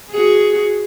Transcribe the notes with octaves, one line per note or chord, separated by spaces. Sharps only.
F#4 G#4